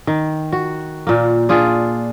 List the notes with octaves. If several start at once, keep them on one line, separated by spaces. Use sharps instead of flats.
D#3
F#4
A#2 A#3
D4 F4 G#4